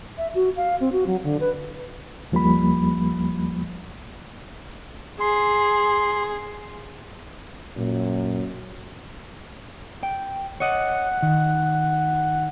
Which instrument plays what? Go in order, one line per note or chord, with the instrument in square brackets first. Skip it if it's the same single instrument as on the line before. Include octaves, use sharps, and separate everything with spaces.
[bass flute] E5
F#4
F5
C4
F#4
F#3
D3
B4
[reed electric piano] D#2 F3 G3 A#3 B5
[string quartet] G#4 [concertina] C6
[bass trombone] F#2 [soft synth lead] A#2
[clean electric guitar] G5
[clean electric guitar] C#5 D#5 [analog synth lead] F#5
[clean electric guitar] D#3